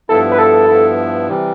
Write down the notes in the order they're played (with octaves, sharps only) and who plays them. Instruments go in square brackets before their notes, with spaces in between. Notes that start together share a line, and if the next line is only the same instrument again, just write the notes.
[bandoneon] G2 F3 B3 E4 [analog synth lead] A4
[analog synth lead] B4
A4
[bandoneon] G2 F3 B3 E4
C3 E3 G3